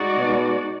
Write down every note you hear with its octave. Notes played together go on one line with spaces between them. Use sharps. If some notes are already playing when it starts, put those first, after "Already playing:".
Already playing: G#3 D#4 F#4 D5
B2